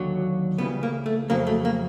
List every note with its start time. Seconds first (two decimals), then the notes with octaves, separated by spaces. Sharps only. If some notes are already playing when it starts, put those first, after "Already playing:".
Already playing: D#2 D3 F#3
0.58 C#2 C#3 E3 G3 B3
0.83 A#3
1.06 A3
1.29 F2 C#3 F#3 A#3
1.47 A3
1.65 A#3